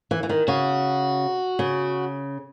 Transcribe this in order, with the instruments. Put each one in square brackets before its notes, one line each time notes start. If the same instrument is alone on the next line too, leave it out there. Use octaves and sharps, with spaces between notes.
[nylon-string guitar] E3
E3
D#3
[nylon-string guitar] C#3 [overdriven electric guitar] F#4
[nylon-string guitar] C#3